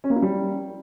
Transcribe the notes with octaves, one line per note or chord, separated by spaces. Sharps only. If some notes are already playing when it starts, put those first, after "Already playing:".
C#4
A#3
E4
G3